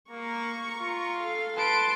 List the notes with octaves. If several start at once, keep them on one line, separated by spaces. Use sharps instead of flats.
A#3 A#5 C#6
F4
A4 F5
B4 A5 C6 D7